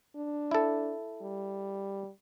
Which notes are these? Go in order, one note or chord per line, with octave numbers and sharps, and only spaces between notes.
D4
E4 A4
G3